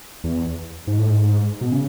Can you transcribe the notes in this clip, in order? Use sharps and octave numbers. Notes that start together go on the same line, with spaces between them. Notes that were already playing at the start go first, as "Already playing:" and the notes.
E2
G#2
A2
G#2
B2
C#3